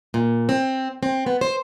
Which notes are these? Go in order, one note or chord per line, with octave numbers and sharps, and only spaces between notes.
A#2
C4
C4
B3
C5